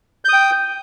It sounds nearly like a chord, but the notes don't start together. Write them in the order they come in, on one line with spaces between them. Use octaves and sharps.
G6 D#6 G5